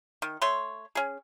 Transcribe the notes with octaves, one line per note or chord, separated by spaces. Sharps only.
D#3
A3 C#5 C6
C#4 G#4